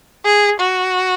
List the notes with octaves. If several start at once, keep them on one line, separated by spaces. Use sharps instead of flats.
G#4
F#4